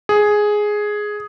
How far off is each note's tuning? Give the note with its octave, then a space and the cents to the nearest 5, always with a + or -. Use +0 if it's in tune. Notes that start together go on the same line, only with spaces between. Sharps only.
G#4 +5